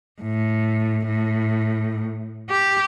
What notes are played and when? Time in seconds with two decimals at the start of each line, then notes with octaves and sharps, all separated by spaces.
0.22 A2
1.07 A2
2.50 G4